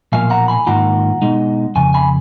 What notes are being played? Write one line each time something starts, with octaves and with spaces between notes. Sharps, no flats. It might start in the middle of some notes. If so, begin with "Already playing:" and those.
B1 A#2 F3 A#3 F5 G#5
F#5 A#5
G#5 B5
G#2 D#3 A#3 F4 F#5 A#5
B2 G#3 D#4
F2 C#3 G#5
G#5 B5